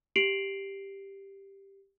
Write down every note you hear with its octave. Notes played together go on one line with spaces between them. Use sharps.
G4 C7 D7 F7 F#7